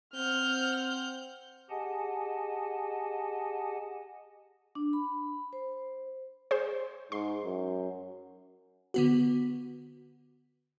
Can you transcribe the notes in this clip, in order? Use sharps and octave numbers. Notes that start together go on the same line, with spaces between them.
C4 F#5 F6 G6
G4 G#4 D#5 F#5 G#5 A5
D4
B5
C5
G#4 C5
G#2 C6
F#2
D3 B3 F#4